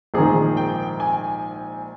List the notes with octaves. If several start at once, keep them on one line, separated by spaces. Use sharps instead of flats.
A#1 G#2 D#3 G#4
G5
G#5